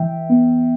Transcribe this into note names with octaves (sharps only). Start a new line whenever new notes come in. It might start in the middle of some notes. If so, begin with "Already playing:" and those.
Already playing: E3 E5 G5
B3